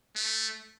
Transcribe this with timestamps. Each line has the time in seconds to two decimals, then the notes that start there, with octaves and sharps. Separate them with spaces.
0.16 A3